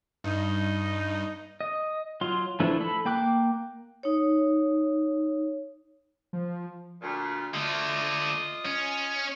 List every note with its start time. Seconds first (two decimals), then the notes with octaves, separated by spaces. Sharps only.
0.24 G2 D#4
1.61 D#5
2.21 F#3 F4 C6
2.60 E3 F3 A3 D4 E4
2.81 A4 B5
3.05 A#3 G5 D6 F#6
4.03 D#4 C#5
6.33 F3
7.02 D2 A#2
7.54 D3 A3 F4 D#5
8.65 C#4